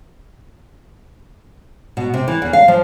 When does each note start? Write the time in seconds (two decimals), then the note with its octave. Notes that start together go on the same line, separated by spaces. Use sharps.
1.97 B2
2.14 C3
2.28 E3
2.42 E2
2.53 F5
2.68 F3